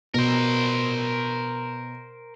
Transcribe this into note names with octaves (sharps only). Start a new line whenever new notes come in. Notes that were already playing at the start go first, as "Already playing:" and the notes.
B2 A#4 C5